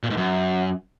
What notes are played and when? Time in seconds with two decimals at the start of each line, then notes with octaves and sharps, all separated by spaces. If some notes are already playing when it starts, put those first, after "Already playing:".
0.03 A#2
0.10 G#2
0.17 F#2